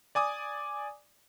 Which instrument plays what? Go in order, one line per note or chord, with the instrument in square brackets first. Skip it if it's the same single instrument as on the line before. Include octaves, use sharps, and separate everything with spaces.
[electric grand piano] D5 G#5 D6 D#6